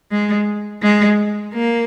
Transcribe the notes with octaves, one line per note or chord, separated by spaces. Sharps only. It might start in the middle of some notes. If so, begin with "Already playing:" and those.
G#3
G#3
A#3